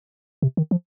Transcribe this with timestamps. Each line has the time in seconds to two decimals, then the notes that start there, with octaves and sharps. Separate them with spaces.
0.42 C3
0.57 D#3
0.71 F3